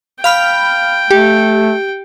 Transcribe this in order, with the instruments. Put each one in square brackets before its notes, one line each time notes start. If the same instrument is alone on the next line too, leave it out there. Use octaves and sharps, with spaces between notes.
[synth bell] F5 B5 F6 [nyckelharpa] G5
[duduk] A3 [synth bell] G4